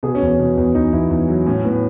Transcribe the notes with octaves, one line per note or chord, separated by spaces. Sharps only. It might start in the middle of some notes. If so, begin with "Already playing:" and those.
B2 G#4
C#4
E2
C#4
B2
E2
E2 D#4
E2 E4
E2
F#3
A2 C#4
A2 B3